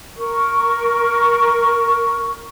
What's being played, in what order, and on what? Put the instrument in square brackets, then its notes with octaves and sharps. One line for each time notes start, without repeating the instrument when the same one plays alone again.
[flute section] A#4 C#6